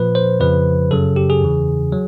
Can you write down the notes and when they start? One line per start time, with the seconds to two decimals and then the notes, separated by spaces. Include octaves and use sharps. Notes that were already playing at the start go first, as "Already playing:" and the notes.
Already playing: A#2 F3 B4
0.15 C5
0.40 F2 C#3 F3 B4
0.91 F#2 C#3 F#3 A4
1.16 G4
1.30 G#4
1.42 E2 C#3 E3
1.92 F#3